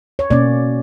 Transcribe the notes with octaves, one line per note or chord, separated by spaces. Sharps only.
C#5
B2 A#3 C#4 D5